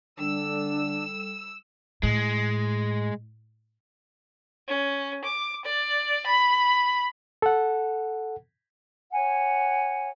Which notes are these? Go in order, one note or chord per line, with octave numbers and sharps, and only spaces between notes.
D3 G3 D4 A4 E6
A2 G#3
C#4
D6
D5
B5
A4 F#5
C#5 F#5 G#5